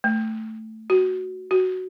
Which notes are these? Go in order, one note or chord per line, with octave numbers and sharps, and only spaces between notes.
A3
F#4
F#4